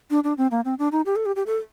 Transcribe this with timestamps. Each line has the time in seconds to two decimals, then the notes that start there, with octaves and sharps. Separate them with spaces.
0.10 D4
0.24 D4
0.38 C4
0.51 A#3
0.65 C4
0.79 D4
0.92 D#4
1.06 G4
1.16 A4
1.26 G4
1.36 G4
1.46 A4